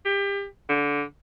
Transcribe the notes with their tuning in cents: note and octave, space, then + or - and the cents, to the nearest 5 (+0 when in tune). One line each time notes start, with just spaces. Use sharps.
G4 +30
D3 -20